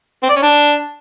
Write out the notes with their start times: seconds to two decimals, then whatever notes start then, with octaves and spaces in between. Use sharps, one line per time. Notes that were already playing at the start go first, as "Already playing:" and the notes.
0.23 C4
0.29 D5
0.36 C#4
0.43 D4